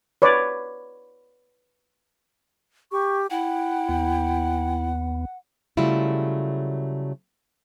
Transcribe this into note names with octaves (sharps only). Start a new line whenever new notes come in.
B4 C#5 D5
G4 C#6
E4 F#5 G5
D#2 B3
C#3 F#3 G3 A3 E4 F4